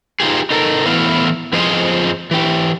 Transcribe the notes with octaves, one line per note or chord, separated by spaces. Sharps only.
D#4 F4 G4 G#4
D#4 A4 A#4
A2 E3 B3 E4 F5
F2 F3 F4 G#4 C5 D#5
E3 G4